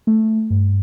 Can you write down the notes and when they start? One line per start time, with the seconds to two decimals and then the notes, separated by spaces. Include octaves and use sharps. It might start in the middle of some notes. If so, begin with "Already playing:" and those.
0.07 A3
0.50 G2